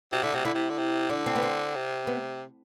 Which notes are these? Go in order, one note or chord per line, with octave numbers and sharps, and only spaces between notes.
C3 F#4
D3 E4
C3 F#4
D3 E4
C3
D3
C3
D3 D4
C4
B3
C4
C3
B3